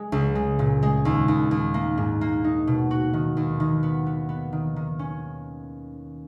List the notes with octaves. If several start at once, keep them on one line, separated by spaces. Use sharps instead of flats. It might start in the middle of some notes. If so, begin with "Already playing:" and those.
Already playing: G#3
C#2
G#3
A#2
G#3
D#2
D#2
D#2
A#3
G#2
A#3
D#4
B2
F#4
D#3
D#2
D#3
B3
B3
B3
D#3
D#3
C#4